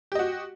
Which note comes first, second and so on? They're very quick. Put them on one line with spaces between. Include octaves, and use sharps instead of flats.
G4 D#5 F#4